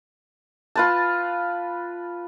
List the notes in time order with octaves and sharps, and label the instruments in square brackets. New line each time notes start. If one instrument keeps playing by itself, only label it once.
[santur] F4 B4 A5